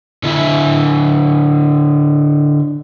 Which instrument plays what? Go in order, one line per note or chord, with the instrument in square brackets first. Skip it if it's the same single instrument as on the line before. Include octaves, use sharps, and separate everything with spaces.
[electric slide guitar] D3 E4 E5